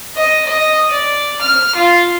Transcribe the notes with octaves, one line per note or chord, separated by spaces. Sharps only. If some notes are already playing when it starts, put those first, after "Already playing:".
D#5
D#5
D5
F6
F4